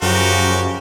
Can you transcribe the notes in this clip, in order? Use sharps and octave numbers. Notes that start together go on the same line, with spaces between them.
F#2 C#3 F3 F#4 G4 A#4